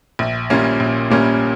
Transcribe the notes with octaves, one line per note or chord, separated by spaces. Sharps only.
A#1
A#2 G3 A#3 C#4
A#1
A#2 G3 A#3 C#4